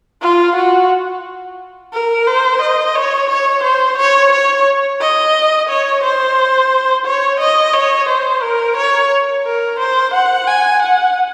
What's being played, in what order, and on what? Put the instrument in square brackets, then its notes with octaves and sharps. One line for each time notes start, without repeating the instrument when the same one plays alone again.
[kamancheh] F4
F#4
A#4
C5
D#5
C#5
C#5
C5
C#5
C#5
D#5
C#5
C5
C#5
D#5
C#5
C5
A#4
C#5
A#4
C5
F#5
G#5
F#5